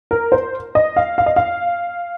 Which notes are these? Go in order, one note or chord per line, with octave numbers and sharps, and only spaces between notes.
A#4
C5
D#5
F5
F5
D#5
F5